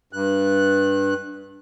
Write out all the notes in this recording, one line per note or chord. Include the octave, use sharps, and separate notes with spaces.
G2 F#6